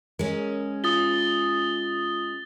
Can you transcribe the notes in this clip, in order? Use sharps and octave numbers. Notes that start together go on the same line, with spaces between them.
G#3 C#4 A#4
F4 D#6 A6 G7